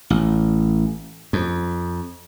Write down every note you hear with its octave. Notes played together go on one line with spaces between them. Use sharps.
A1
F2